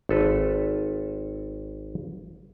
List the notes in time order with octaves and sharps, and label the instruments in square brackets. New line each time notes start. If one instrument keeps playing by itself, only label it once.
[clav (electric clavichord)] G#1 A4 B4